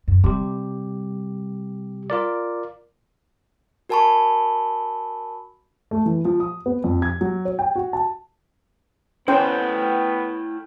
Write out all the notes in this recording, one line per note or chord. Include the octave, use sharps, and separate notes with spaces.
F#2
C3 G3 G4
F4 A#4 D5
F#4 A#4 G#5 A5 B5 C#6
A3
E3
F3
D#6
B3
F2
G#6
F#3
C#5
G5
F#4
A5
B3 C#4 E4 A4 C5 F#5 G5